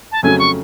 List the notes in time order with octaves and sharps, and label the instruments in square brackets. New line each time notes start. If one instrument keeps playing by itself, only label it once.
[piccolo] A5
[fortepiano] F2 C#3 F#3 A3 C#4 [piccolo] G#5
[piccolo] C#6